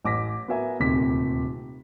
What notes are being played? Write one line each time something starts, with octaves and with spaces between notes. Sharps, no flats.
A1 D6 A#6 B6
B3 F#4 A#4 E5 G#5
D#1 D2 C3 D#3 D6 B6